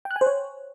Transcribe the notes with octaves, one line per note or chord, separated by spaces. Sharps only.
G5
F#6
G#5
C5
C#5